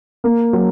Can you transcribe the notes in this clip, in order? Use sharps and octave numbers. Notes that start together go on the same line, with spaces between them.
A#3
F#3